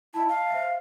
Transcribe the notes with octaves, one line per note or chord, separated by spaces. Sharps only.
E4 D#5 A5
F5
C5 E5